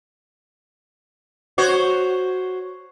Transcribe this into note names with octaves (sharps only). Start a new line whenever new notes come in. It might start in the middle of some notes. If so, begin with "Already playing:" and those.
F#4 C5 C#5